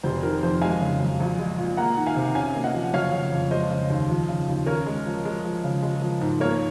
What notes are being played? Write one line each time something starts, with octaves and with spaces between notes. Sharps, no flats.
F1 C5
D#3 A#4
F2 C5
G#3 F5 G#5
C#3
F#2
A#1
G#3
A#2
A#3 F#5 A#5
D#3
F5 G#5
C3
C#4 F5 G#5
A#3
D#5 F#5
F3
F#1 C#5 F5
C#3
F2
G#3 C5 D#5
C#3
D#2
F3
C#3
D#2
C#4 A#4 C#5
G#3
F3
G#3
F3
C#3
G#3
F3
G#2
A#3 A#4 C#5